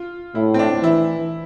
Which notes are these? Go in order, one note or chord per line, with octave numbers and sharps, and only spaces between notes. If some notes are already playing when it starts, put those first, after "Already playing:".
Already playing: F4
A2 E4
C4
D4
E3 E4